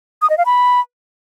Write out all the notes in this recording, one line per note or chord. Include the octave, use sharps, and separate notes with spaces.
D#6
D#5
F5
B5